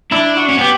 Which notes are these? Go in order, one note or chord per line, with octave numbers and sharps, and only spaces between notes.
D4 E4
F#4
C#4
B3 G4